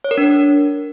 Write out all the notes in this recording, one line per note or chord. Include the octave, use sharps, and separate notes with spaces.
C#5
A#4
D4